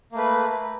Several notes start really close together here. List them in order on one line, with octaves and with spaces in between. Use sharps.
A#3 A3 B4